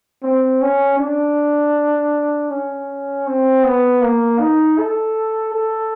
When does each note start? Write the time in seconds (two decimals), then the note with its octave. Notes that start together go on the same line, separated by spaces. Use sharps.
0.23 C4
0.61 C#4
0.99 D4
2.50 C#4
3.27 C4
3.64 B3
4.02 A#3
4.39 D#4
4.78 A4
5.54 A4